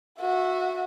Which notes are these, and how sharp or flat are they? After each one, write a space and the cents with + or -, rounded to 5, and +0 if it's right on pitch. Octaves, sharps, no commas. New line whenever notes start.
F#4 -20 E5 +0